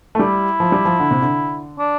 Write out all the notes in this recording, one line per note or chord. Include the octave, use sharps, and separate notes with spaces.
A3
G3 E4
F3
G3
F3
D3
C3
D3
D4